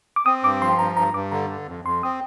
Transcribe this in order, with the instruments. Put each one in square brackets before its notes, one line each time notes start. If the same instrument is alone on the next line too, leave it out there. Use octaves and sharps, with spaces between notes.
[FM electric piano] D6
[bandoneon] C4 [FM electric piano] D#6
[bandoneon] G2 [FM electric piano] D6
[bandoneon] F3 [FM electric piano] C6
[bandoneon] G2 [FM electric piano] A#5
[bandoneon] G2 [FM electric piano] A#5
[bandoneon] G2 [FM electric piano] D6
[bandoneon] D3 [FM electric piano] A#5
[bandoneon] D3
F2
[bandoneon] F2 [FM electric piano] C6
[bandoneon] C4 [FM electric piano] D#6